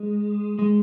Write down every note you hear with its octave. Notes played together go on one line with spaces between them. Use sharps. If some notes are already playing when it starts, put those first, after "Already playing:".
Already playing: G#3
G#3